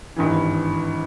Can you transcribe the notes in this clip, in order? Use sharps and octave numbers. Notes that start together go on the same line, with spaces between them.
G#1 G2 E3